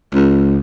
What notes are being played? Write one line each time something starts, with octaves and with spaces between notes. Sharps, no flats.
C#2